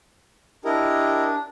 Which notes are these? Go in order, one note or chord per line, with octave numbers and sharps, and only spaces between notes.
D4 E4 G4 A#4 D#5